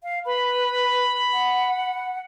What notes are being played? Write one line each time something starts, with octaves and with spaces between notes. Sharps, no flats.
F5
B4 B5
F#5